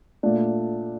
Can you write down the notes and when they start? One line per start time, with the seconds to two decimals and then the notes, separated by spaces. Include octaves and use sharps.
0.23 A#2 A3 D4